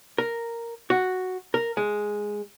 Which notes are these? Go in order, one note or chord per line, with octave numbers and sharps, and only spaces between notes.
A#4
F#4
A#4
G#3